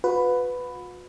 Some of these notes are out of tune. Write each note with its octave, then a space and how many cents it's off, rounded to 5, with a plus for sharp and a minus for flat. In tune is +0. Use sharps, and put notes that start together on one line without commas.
F#4 -45 B4 +10